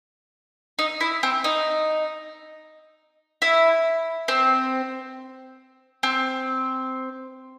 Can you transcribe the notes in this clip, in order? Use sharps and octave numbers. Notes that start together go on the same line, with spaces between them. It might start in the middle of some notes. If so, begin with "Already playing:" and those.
D#4
E4
C4
D#4
E4
C4
C4